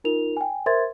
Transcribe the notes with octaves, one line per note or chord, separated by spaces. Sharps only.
D#4 F4 A#4 F7
G5 G#5
A#4 C5 E5 C6 G#6 A6